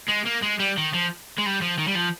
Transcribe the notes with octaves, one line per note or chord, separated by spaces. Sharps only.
G#3
A#3
G#3
G3
D#3
F3
G#3
G3
F3
D#3
G3
F3